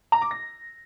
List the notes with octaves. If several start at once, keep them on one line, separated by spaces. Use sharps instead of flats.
A#5
D6
A#6